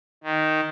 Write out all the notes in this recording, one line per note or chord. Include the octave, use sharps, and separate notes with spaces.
D#3